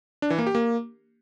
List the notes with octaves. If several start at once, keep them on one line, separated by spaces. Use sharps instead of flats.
D4
E3
A#3
G4
A#3